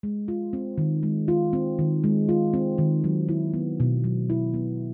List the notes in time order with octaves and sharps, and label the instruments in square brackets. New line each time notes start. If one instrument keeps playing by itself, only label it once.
[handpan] G#3
F4
C4
D#3
G#3
F4
C4
D#3
G#3
F4
C4
D#3
F#3
E4
B3
B2
F#3
E4
B3